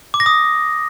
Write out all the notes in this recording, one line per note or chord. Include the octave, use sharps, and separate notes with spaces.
D6
A#6
D#6